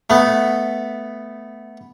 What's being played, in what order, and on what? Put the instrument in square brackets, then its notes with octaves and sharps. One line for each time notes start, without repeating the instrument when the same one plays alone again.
[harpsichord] A3 B3